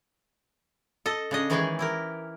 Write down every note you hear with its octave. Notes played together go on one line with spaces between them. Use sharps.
A4 D#5
C#3 D4 D#5
D#3 E3 G#3 C#4 G4 G#4
E4 G4 A#4